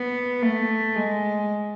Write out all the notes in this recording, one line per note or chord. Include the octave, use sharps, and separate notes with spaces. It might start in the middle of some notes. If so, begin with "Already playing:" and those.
Already playing: B3
A3
G#3